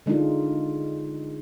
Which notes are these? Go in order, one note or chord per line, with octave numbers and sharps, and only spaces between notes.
D3 G#3 D4 D#4 F4